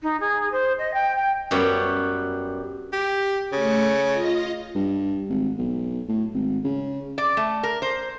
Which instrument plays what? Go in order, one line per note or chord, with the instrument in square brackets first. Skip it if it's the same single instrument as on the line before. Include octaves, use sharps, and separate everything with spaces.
[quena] D#4
G#4
C5
D#5
G5
G5
[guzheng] F#2 G3 B3 C#5 G5
[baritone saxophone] G4
[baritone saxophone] C#3 [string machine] A3 C#7
[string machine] F4 D#5 A#6
[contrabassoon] G2
G#1
B1
A2
G#1
C#3
[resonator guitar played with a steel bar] D5
A3
A#4
C5